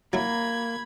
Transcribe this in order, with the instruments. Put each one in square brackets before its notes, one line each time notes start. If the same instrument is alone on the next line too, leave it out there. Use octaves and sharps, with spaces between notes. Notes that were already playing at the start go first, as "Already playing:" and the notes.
[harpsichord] F#3 E4 [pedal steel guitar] A#3 [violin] B5 G#6